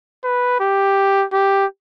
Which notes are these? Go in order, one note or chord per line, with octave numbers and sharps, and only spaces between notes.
B4
G4
G4